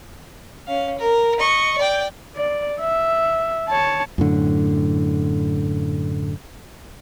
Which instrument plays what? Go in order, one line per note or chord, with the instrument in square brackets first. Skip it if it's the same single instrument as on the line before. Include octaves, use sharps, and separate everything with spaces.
[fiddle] C#4 F5
A#4
D#5 C#6
D5 G5
[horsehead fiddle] D5
E5
C#5 A5
[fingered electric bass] F#2 A2 D3